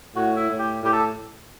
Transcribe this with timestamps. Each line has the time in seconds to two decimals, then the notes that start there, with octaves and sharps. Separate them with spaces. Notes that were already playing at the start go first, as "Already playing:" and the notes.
0.13 A2 F#4
0.36 E4
0.48 A2
0.58 G4
0.81 A2 G4
0.93 A4